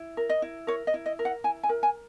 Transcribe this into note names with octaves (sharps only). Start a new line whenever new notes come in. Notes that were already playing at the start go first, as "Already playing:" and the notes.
Already playing: E4
A#4
D#5
E4
A#4 C#5
D#5
E4
D#5
A#4
F#5
E4 G#5
G#5
A#4
G#5